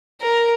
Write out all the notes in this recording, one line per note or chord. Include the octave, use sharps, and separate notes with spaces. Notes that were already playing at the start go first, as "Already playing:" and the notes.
A#4